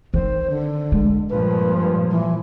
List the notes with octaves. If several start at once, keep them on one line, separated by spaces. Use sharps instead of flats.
D#3 C4 C5
D3
G#3
G2 A#2 F3 B4
E3